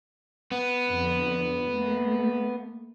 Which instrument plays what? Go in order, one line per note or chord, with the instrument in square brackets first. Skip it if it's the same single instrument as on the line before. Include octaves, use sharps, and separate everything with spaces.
[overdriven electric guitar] B3
[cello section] F2 D3
A3 A#3